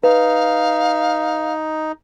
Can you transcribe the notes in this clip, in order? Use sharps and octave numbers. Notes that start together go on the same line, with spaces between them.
D#4 B4 F5